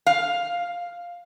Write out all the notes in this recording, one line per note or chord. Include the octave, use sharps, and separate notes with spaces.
F5